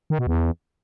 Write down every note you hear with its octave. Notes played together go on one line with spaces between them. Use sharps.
D#3
B2
E2